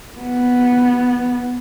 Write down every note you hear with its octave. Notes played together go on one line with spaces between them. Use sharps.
B3